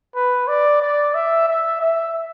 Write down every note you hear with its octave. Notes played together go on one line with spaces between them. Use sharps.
B4
D5
D5
E5
E5
E5